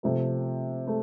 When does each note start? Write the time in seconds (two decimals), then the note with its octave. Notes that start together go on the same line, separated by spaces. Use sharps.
0.03 C3 F3 A3
0.87 A3